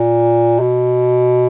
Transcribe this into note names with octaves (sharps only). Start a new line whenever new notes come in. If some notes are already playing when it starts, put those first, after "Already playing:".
Already playing: A#2
B2